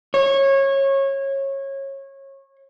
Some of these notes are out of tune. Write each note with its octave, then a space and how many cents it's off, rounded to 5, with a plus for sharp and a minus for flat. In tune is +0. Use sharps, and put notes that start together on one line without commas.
C#5 -25